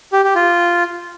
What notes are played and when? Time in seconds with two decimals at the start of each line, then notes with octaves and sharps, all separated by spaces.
0.12 G4
0.24 G4
0.36 F4